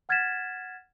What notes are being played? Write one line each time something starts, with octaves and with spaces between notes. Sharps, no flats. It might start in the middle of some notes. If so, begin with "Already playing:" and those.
F#5 F6 G#6 A6 B6 E7